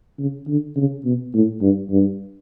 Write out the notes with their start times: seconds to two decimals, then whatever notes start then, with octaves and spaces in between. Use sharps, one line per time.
0.19 C#3
0.47 D3
0.76 C#3
1.04 B2
1.34 A2
1.61 G2
1.90 G2